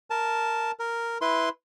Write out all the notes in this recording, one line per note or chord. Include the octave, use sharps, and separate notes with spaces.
A#4 A5
A#4
E4 B4 C6